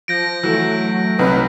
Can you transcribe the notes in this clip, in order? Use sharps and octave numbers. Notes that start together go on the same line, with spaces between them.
F3 G6 A#6 D7
E3 F#3 A3
C2 F#3 D#4 B4